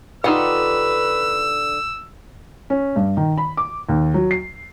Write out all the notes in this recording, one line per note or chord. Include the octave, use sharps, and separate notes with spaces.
D3 D#4 F4 G4 B4 F#5 E6
C#4
G2
D#3
B5
D6
D#2
F#3
C7